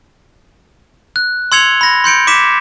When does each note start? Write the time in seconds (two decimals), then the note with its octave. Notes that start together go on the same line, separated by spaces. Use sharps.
1.16 F#6
1.52 C6 E6 G#6 C#7 F7 G7
1.81 B5 A#6
2.04 C6 G6 C#7 D7
2.27 D6 B6 E7